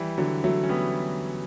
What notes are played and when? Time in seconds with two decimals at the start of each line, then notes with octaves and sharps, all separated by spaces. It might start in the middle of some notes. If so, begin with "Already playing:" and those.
Already playing: E3 G3
0.18 D3 F#3
0.44 F#3 A3
0.63 C#4
0.69 G3 B3